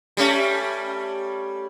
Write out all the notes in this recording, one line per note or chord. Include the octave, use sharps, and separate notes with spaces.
G3 A3 C#4